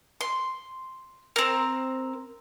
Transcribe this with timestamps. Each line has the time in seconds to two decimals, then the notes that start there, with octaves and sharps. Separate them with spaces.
0.21 C6
1.36 C4 A#4